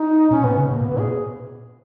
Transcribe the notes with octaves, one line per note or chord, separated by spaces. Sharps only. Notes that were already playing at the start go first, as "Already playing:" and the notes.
Already playing: D#4
B2 C#4
A#2 B3
C#3
B2 A#3
A#2
B3
A#2
G#4